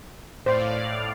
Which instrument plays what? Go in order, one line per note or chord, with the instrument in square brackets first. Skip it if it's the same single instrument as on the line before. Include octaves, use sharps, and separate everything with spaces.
[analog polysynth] A2 D5 F5 [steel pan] C5